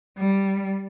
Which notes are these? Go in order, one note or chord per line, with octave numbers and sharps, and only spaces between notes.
G3